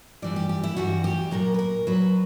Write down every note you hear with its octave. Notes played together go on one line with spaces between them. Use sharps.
G2 E3 G3 D5
G4
G4
E4
G2 E3 G3 F#4
G4
A#2 F#3 A#4
B4
A#4
A#2 F#3 B4